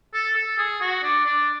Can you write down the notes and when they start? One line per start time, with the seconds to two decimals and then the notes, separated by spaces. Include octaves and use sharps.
0.14 A4
0.36 A4
0.58 G#4
0.81 F#4
1.03 D4
1.25 D4